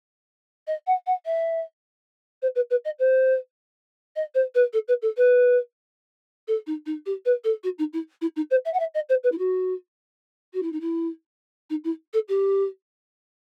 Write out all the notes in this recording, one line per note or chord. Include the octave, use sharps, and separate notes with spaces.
D#5
F#5
F#5
E5
C5
B4
B4
D#5
C5
D#5
C5
B4
A4
B4
A4
B4
A4
D#4
D#4
G4
B4
A4
F#4
D#4
E4
E4
D#4
C5
E5
F#5
E5
D#5
C5
B4
E4
F#4
F#4
E4
D#4
E4
D#4
E4
A4
G4